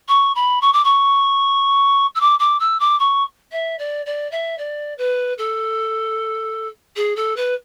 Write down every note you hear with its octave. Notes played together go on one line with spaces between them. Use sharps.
C#6
B5
C#6
D6
C#6
E6
D6
D6
E6
D6
C#6
E5
D5
D5
E5
D5
B4
A4
G#4
A4
B4